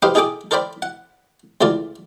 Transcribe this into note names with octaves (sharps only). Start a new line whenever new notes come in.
D#4 G4 B4 C5 F5 G5
D#4 G#4 A4 G5 D6 D#6
A4 A#4 C5 D5 G5 B5
F#5
C#2 E3 A3 F4 D5